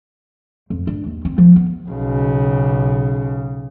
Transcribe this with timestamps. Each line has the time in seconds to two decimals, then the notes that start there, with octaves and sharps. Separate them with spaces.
0.70 F2
0.87 D4
1.06 D#2
1.25 C4
1.38 F3
1.56 B3
1.89 B1 C#3